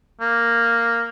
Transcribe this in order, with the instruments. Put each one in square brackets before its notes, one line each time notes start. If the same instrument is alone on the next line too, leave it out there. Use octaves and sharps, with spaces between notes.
[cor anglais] A#3